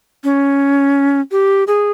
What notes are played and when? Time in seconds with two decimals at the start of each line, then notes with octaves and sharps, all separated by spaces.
0.24 C#4
1.32 G4
1.67 G#4